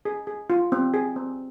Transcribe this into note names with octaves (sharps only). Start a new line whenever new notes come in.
G#4
G#4
F4
C4
G#4
C4